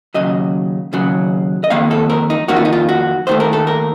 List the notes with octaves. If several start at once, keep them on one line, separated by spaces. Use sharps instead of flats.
D#2 C#3 F#3 D#5
D#2 C#3 F#3
D#5
F2 D#3 A#3 F5
A4
A#4
D#4
F2 D#3 A#3 F#4
F4
D#4
F4
F#4
D#2 D#3 A3 C5
A#4
A4
A#4